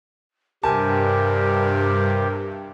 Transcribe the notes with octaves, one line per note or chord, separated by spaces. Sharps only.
G2 C3 G4 A#4 G#5 A5